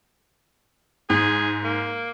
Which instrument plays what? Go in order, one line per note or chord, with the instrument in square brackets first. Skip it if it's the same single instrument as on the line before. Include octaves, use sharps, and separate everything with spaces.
[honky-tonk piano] G#2 [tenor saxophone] G#4
[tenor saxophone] A#3